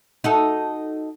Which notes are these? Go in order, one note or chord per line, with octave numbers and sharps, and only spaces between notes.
D#4 F#4 A4